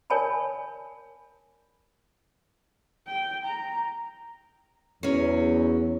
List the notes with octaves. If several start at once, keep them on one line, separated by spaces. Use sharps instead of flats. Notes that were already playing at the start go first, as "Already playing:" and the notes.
A#4 C#5 D5 G#5 A5 B5
G5
A#5
E2 F#3 C#4